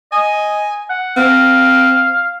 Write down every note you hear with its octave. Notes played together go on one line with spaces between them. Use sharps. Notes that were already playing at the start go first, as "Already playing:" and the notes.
D#5 G#5
F#5
C4 F5